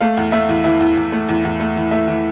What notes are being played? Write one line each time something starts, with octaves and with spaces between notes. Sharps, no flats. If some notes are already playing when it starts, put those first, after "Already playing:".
A3 F5
E2
A3 E5
E2
E3 E5
E2
E2
A3
E2
E2
A3
E3
A3 E5
E3